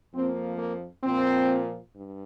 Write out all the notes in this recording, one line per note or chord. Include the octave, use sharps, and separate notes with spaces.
F2 F3 A#3 C4
A#3
A#2 F3 A#3 C4
G2